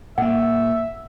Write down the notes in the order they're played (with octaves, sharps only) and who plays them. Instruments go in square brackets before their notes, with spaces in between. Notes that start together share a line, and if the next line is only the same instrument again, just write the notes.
[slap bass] A#2 A#3 [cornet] E5 [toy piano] F#5